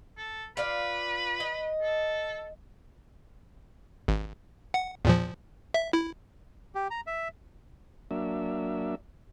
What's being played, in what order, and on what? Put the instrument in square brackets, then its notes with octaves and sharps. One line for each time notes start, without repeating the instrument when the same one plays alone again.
[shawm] A4
[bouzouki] F4 D5 F5 [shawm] B4
[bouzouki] D#5
[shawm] A4
[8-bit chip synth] G#1
F#5
E2 A#2 F3
E5
E4
[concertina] G4
A#5
E5
[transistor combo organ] F#3 A#3 D4 E5